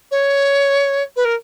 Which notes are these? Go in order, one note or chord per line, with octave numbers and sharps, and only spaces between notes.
C#5
B4
A#4